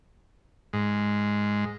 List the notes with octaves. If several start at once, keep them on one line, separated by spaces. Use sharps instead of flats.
G#2